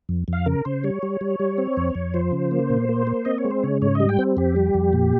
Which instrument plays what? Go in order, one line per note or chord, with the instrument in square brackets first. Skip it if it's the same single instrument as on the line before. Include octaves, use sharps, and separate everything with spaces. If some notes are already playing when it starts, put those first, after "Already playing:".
[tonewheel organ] F2
F2 F5
C#3 A#4
C#3 C5
G3 C#5
G3
G3
G3
C4
F2
F2
F3 C5
C#3
A#3
A#2
A#3
A#3
C4 D#5
C#5
G#3
C5
C#3 C#5
G#2 C#5
D#5
G3
G5
C4
F2 G4
G3
F2
A#2